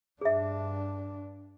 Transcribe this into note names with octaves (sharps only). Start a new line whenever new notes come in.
G2 D4 G#4 E5